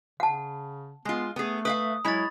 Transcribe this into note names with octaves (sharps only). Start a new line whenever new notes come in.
C#3 F#5 A5
G#3 B3 F4
A3 B3 G#4
B4 E5 F5 D#6
F#3 G#3 E4 C#5 B5 A6